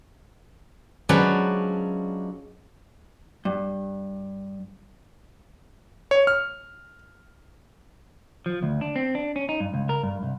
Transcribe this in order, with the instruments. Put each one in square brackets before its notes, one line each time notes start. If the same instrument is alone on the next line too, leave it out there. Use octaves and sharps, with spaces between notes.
[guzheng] F3 F#3 G#3 C#4 D4 B4
[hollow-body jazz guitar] G2
[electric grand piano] C#5
F6
[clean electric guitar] F3
D2
D4
C4
D4
C#4
D#4
G2
C#2
A#4
G2
C2